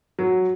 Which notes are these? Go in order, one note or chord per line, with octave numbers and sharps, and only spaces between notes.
F#3